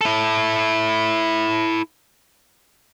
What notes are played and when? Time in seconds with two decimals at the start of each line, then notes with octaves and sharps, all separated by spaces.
0.01 E4 A4